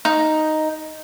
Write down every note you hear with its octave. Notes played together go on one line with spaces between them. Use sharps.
D#4